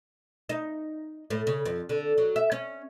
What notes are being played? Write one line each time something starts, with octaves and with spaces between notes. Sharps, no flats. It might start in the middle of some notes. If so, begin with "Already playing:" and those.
D#4
A2
C#3
F2
D3
F#3
E5
C#4